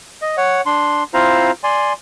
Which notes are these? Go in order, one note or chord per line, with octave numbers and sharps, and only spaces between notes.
D#5
C#5 F#5
D4 C6
C4 E4 F4 C5 F5 A#5
D5 G#5 C6